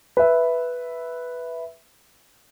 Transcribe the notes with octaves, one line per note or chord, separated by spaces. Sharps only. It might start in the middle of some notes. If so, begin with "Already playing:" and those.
B4 E5